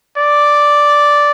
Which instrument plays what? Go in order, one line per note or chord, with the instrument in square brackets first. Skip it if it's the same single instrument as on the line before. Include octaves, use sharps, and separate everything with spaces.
[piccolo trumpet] D5